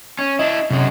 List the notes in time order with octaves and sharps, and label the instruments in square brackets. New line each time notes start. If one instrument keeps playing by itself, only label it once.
[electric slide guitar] C#4
[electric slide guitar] D4 E4 [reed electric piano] D#5
[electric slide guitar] F#2 G#3 [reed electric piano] C3